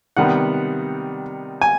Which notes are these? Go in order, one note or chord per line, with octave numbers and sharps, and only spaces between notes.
C3 D#3 G3 B3 F#5
G#5